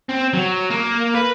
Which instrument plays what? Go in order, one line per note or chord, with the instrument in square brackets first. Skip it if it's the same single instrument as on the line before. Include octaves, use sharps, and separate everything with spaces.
[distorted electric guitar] C4
F#3
A#3
B4